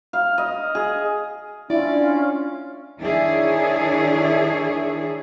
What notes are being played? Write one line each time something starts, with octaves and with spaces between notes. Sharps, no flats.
F5
D#5
G#4
C#4 D4 E4 F4 D5
D#3 D4 E4 G#4 C#5 E5